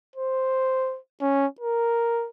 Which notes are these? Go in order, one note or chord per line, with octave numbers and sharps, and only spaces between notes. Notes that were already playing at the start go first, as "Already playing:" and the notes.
C5
C#4
A#4